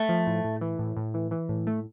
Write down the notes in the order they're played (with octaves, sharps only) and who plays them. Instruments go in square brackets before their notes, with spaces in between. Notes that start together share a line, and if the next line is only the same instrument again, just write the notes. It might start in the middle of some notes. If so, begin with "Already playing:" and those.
Already playing: [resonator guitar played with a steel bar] A3
[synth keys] F3
A2
A2
E3
A2
A2
E3
E3
A2
A3